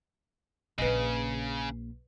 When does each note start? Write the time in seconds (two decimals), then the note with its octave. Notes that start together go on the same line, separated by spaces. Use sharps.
0.78 A#1 C#3 A#3 B4 D#5